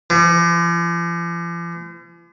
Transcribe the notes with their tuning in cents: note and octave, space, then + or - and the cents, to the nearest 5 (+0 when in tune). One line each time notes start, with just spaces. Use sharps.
F3 -45